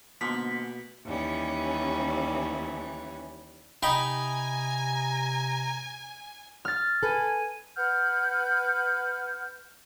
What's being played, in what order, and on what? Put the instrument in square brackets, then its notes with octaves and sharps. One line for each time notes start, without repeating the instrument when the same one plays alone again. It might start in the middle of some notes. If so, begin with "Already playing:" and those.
[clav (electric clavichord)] G#2 D3 F3 [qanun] B2 [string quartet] A#3 [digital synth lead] B6
[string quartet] D#2 E3 G3 C#4
[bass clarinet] C3 [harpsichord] D#4 G5 B5 [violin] G#5 [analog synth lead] A#5
[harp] F6 A6
[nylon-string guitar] A4 B4 [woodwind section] G#5
[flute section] B4 F#5 F6 G6